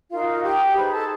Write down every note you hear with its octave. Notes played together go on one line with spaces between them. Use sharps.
D#4 F4 F#4 A#4 F5
G4 G5
D#4 G#4 B4 C5 B5
A4 A5